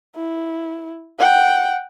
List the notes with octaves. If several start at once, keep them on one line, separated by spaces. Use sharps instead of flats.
E4
F#5 G5